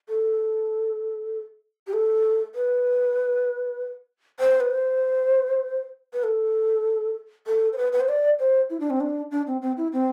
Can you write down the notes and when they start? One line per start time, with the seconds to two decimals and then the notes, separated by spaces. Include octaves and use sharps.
0.09 A4
1.87 G4
1.93 A4
2.55 B4
4.40 C5
4.60 B4
4.71 C5
6.13 B4
6.23 A4
7.47 A4
7.73 C5
7.78 B4
7.92 B4
8.00 C5
8.08 D5
8.39 C5
8.70 E4
8.80 D4
8.90 C4
9.00 D4
9.31 D4
9.47 C4
9.62 C4
9.77 E4
9.93 C4